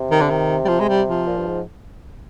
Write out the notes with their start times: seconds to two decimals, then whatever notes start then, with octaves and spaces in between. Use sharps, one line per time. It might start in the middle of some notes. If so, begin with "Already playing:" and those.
Already playing: C3
0.11 D#3
0.21 D3
0.30 D#3
0.65 G3
0.68 F3
0.80 G#3
0.89 G3
1.08 F3
1.27 A#2
1.38 G2
1.47 G#2